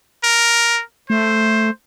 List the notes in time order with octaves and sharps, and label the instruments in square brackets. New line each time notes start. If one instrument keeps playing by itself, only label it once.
[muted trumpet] A#4
[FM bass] A3 [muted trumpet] C5